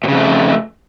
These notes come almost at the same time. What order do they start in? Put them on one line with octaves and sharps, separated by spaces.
A#2 C#3 F2 A3